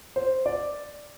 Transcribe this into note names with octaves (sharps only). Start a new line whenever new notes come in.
C5
D5